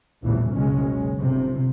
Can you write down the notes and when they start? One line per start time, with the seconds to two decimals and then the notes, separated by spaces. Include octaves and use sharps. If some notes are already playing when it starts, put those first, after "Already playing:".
0.22 A#1 E2 A2 C#3 E3 G3
0.55 F#1 C#2 B2 G#3 C#4
1.18 G1 C3